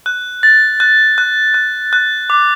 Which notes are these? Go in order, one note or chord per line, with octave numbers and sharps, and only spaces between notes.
F#6
A6
F#6
F#6
F#6
F#6
D6